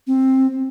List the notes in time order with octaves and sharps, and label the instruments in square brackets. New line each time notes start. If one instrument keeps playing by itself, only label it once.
[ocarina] C4